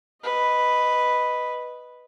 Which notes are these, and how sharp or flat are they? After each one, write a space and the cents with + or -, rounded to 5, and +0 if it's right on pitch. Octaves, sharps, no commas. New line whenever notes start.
B4 +0 D#5 +0